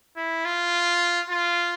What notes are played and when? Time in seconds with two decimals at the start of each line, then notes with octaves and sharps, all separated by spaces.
0.17 E4
0.45 F4
1.30 F4